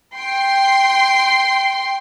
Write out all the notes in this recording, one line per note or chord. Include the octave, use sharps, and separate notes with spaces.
G5 C6